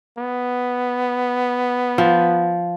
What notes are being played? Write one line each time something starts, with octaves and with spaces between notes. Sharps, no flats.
B3
F3